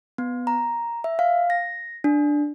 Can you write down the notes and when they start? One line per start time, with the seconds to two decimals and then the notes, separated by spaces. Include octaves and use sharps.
0.18 B3
0.47 A#5
1.04 E5
1.19 F5
1.50 A#6
2.04 D4